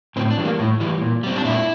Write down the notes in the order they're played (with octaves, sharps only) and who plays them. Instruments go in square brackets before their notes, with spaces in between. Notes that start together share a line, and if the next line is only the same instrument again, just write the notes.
[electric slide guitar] A2 C4
D4
E3 G3
A#3
A2
E3 G3
A#2
G3 C4
D4
A#2 E4